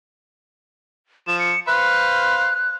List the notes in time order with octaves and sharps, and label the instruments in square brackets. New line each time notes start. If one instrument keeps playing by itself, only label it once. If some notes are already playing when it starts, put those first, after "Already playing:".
[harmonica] F3 [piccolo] E7
[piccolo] C#7
[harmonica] B4 C5 F5 [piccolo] F#6